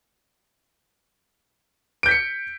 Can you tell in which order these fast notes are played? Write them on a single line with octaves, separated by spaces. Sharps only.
D7 G6 B6 C#7